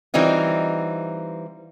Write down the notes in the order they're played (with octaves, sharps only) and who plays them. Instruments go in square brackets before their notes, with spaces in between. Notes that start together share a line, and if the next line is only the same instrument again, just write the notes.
[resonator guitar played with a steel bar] E3 G3 C4 D#4 F4